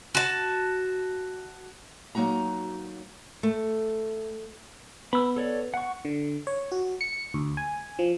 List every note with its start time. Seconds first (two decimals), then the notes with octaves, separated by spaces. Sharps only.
0.15 F#4 A5
2.15 F#3 A#3 D#4 F#4 A#5
3.43 A3
5.13 B3 B5 E6
5.36 A4 C#5 D5
5.74 F#5 C#6
6.05 D3
6.47 C#5
6.72 F#4
7.01 C#7
7.34 D2
7.57 G#5
7.99 F3